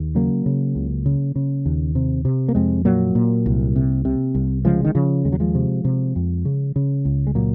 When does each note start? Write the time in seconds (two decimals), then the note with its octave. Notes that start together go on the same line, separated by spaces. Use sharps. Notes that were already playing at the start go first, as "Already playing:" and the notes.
Already playing: D#2
0.15 C#3 F#3 A#3
0.46 C#3
0.75 C#2
1.06 C#3
1.36 C#3
1.66 D#2
1.95 C3
2.25 C3
2.49 A#3
2.55 F2 G#3 C4
2.85 A#2 F#3 A#3
3.15 A#2
3.46 C2
3.76 C3
4.05 C3
4.35 C2
4.65 C#3 F3 G#3
4.85 D#3
4.95 C#3 F3
5.25 D#2 G#3
5.32 F#3
5.40 F3 G#3
5.55 C3
5.85 C3
6.16 F2
6.45 C#3
6.76 C#3
7.05 C#2
7.27 G#3
7.35 A#2 F#3 A#3